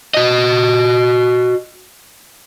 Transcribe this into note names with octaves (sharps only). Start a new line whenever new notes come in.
F#4 D#5